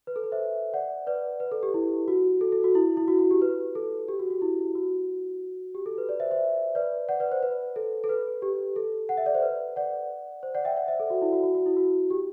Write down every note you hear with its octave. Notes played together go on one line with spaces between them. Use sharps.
B4
A4
B4
C5 E5
D5 F#5
B4 D5
B4
A4
G4
E4
F#4
A4
A4
F#4
E4
E4
F#4
F#4
G4
B4
A4
G4
F#4
F#4
E4
F#4
G4
A4
B4
B4 D5
C5 E5
C5 E5
B4 D5
D5 F#5
B4 D5
C5
B4
A4
A4
B4
G4
A4
F#5
E5
D5
C5
B4
D5 F#5
C5
D5 F#5
E5 G5
D5 F#5
C5 E5
A4
F#4
E4
F#4
F#4
F#4
E4
F#4
G4